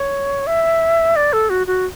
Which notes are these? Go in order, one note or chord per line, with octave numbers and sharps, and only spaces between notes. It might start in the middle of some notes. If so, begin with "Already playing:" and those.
Already playing: C#5
E5
D5
A4
F#4
F#4